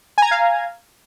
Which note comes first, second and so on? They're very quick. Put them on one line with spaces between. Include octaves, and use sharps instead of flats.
G#5 A#5 G#6 F5